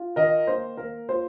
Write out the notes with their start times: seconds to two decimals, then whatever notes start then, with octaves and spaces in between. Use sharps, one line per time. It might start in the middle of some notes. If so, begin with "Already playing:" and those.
Already playing: F4
0.16 D#3 A#4 D#5
0.47 A#3 C5
0.77 A#3 A#4
1.09 F4 C5